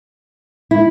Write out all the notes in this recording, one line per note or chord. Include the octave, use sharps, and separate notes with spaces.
E4